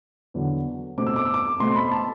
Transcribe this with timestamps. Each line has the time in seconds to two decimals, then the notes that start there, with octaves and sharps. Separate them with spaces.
0.34 E2 D3 F#3
0.98 B2 A3 C4 D6
1.06 E6
1.16 D6
1.25 E6
1.34 D6
1.60 B2 A3 C4 C6
1.76 B5
1.92 A5